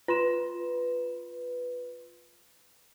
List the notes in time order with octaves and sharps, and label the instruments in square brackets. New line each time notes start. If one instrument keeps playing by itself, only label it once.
[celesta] F4 C6 E7 [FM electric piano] B4